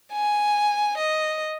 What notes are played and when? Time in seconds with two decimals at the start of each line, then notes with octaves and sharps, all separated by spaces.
0.13 G#5
0.98 D#5